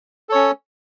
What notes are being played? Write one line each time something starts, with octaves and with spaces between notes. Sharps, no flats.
C#4 A4 C#5